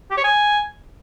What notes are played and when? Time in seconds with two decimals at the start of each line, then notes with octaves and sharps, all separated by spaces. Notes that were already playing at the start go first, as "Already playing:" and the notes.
0.10 G4
0.17 C#5
0.24 G#5